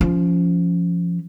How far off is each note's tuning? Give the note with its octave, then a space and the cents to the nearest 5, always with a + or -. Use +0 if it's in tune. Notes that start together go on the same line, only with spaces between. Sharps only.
F3 -10 C#4 +20